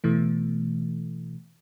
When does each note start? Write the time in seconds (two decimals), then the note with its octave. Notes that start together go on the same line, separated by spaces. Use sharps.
0.04 B2 E3 A3